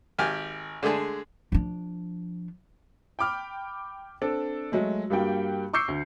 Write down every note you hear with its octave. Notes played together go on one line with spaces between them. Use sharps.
G#1 G4 G#5 F6
D3 G#3 A3 G#4 A5
F3 D4
G5 B5 D6 F6
C4 D4 A4
F#3 G#3 A3
G2 G3 A#3 F#4 G5
C#6 D6 E6 G6 C7 C#7
D2